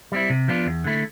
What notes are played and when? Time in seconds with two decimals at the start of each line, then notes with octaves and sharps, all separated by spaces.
0.12 G3 C4 E4
0.30 C3
0.48 F3 B3 D4 F4
0.66 E2
0.84 D3 A3 E4